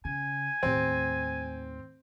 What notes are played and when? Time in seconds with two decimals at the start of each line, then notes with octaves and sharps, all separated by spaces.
0.05 C#3 G#5
0.63 D#2 A2 C4